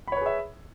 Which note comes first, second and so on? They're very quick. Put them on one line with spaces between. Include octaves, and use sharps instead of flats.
B5 C#5 B4 G#4 E5